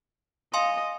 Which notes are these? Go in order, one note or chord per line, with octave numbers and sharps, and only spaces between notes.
D#5 F5 G#5 C6